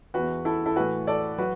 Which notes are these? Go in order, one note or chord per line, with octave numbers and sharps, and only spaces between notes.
E2 E3 F#4 B4
E4 A4
E4 A4
A2 E3 F#4 B4
A4 D5
F#3 F#4 B4